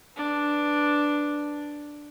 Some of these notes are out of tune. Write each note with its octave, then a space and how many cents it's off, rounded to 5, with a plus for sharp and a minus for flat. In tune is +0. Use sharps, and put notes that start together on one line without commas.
D4 +0 B4 +0